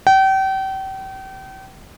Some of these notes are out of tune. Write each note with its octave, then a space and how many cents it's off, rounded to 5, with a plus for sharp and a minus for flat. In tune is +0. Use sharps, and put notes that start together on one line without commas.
G5 -35